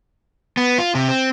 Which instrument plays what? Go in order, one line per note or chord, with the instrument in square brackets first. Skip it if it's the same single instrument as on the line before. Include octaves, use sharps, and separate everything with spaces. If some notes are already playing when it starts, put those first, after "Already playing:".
[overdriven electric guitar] B3
F4
C3
C4